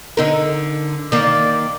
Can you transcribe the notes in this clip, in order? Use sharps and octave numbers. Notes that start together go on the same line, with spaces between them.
D3 D#4 A#4
D#3 A#3 D5